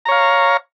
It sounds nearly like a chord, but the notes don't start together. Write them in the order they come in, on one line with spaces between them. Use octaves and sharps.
A#5 C#5 F5